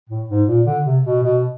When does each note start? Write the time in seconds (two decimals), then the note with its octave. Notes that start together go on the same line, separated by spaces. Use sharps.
0.09 A2
0.29 G#2
0.47 A#2
0.66 D3
0.85 C3
1.05 B2
1.23 B2